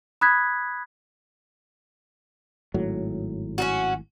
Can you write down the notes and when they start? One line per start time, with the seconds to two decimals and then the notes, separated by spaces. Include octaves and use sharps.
0.21 B5 D#6 F#6 G#6 B6
2.74 G#1 A2 F#3
3.58 C#4 D#4 F#4